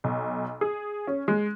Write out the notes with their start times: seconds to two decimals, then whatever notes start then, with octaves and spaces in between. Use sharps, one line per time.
0.04 B1
0.61 G#4
1.07 C#4
1.28 G#3